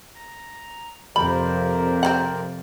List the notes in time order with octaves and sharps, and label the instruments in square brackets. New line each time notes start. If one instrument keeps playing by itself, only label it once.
[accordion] A#5
[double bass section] F2 C3 [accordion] A#4 C5 D5 [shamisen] B5
[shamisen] C4 F#5